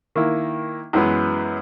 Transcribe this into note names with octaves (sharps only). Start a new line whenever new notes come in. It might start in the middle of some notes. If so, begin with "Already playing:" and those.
D#3 A#3 E4
F#2 E3 G#3 B3